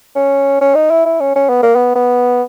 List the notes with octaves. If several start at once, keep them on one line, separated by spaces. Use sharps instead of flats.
C#4
C#4
D#4
E4
E4
C#4
C#4
B3
A#3
B3
B3